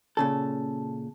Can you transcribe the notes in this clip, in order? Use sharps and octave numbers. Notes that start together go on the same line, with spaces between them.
A#2 C#3 A4